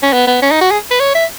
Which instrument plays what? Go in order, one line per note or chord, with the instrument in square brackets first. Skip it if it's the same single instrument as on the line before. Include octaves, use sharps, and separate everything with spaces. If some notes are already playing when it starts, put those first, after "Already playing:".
[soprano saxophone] C#4
B3
B3
C#4
D#4
F#4
G#4
B4
C#5
E5